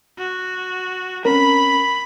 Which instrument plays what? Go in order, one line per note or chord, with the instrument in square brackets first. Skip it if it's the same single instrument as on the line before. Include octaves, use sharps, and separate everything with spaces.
[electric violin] F#4
[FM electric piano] C4 C#4 A#4 [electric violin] B5